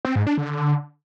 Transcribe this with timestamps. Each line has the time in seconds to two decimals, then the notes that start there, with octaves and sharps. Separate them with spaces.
0.05 C4
0.16 G#2
0.27 D4
0.38 D3